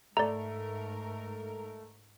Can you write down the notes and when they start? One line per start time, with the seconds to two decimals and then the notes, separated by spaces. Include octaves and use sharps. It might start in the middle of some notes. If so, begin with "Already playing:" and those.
0.17 G#2 A3 A#4 D5 A#5